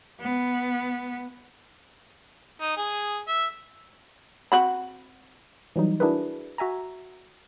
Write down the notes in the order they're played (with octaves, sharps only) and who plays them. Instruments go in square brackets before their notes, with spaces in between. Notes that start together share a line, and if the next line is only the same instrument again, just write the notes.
[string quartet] B3
[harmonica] D#4
G#4
E5
[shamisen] C4 F#4 B5
[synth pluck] E3 F#3 G3 D#4
D4 E4 F#4 G#4 A#4 B4
F#4 E5 G#5 A#5